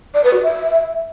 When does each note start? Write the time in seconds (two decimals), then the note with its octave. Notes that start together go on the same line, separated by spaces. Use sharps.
0.14 D5
0.24 B4
0.33 F#4
0.43 E5